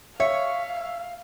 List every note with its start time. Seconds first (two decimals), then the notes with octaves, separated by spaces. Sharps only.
0.20 C#5 E5 F5